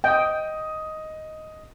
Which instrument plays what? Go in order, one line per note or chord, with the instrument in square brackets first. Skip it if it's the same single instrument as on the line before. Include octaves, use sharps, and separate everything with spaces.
[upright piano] D#5 D#6 [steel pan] G5